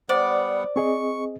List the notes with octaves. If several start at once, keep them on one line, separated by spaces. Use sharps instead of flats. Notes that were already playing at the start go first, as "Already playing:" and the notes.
G3 B3 C5 D5 F#5
C4 G#4 D#5 C#6